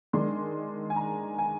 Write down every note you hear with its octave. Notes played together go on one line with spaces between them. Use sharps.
D#3 G#3 D4 C6
G#5
A#5
G#5